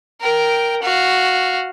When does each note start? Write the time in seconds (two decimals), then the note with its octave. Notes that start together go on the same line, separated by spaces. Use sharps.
0.21 A#4 G5
0.83 F#4 F5